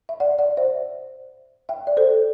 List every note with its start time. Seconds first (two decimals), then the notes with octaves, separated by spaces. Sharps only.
0.09 E5
0.20 D5 F#5
0.38 D5 F#5
0.57 C5 E5
1.69 E5 G5
1.87 D5
1.97 A4 C5